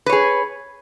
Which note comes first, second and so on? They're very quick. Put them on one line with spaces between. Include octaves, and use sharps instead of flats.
B4 C#5 G#4